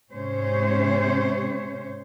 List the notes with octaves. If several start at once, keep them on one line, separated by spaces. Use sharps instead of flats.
G#2 C3 C#4 C5 C#5